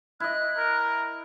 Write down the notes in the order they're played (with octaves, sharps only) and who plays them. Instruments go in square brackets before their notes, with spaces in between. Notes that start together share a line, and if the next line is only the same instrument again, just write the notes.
[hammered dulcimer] E4 D#5 [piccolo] F#6
[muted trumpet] A#4